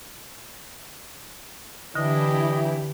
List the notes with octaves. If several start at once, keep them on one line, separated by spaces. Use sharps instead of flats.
D3 E3 D4 E4 G4 D#5